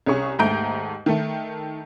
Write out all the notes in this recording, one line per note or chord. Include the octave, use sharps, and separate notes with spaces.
C2 C#4 G#4 C#6
D#2 G#2 A3 A#5 G6 D7
D#3 A3